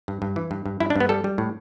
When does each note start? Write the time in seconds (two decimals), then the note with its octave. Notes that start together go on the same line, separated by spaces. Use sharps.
0.08 G2
0.22 G2
0.36 E3
0.51 G2
0.66 G2
0.80 G2 E4
0.90 D4
0.96 G2 B3
1.09 G3 A4
1.24 G3
1.38 A2